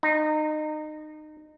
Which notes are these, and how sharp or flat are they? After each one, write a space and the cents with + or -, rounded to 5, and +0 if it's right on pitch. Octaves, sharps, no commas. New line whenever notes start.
D#4 -25